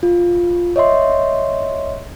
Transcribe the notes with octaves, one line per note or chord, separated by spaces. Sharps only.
F4
C#5 D#5 E5 C6